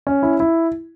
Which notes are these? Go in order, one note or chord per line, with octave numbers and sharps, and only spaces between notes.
C#4
E4
E4